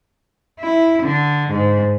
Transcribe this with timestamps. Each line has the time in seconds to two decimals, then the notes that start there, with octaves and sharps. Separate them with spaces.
0.59 E4
1.02 D3
1.50 G#2